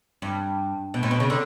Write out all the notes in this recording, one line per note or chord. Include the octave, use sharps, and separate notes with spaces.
G2
B2
A2
B2
C#3
D3